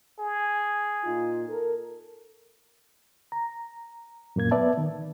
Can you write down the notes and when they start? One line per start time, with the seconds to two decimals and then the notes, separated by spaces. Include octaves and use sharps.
0.19 G#4
1.04 A#2 D#4 F4
1.48 A4 A#4
3.32 A#5
4.36 F#2 A#2 A#3 G#6
4.51 B3 B4 D5 E5 A5
4.77 D#3